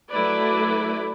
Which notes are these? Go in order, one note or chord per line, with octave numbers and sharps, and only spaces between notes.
F#3 A3 E4 B4 D5